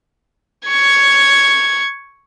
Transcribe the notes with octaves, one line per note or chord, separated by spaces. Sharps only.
C#6 G#6